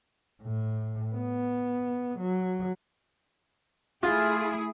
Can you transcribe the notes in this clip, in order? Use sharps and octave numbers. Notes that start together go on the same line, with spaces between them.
A2
B3
F#3
A3 E4 F4 G#4